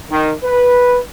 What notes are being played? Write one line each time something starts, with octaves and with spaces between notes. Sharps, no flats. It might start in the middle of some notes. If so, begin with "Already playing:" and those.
D#3
B4